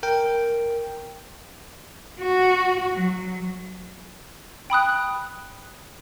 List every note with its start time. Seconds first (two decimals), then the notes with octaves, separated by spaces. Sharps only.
0.03 A#4 G5
2.21 F#4
2.93 F#3
4.70 G5 B5 D#6 F#6